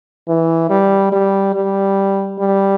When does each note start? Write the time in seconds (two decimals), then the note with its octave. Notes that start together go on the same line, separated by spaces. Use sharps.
0.28 E3
0.70 G3
1.12 G3
1.54 G3
2.39 G3